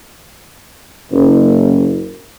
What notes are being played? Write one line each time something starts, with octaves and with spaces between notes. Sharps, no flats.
F#1